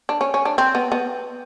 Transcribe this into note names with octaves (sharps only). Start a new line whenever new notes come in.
D4
C#4
C#4
D4
C4
B3
B3